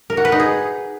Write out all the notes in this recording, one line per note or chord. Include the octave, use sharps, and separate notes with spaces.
A#4
F#4
B4
D#4
G#4